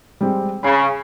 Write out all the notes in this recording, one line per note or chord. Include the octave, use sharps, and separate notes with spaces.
G3 G#3 C4
C#3 B5 C7